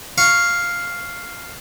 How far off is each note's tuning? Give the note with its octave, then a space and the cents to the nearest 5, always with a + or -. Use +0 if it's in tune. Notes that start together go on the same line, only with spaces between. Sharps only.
F5 +0 C#6 +0